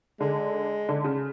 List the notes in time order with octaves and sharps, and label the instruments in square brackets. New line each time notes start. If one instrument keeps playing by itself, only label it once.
[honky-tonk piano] D3 [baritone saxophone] G#3
[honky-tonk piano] D3
C#3